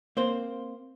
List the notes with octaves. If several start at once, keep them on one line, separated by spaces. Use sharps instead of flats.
A#3 C4 C5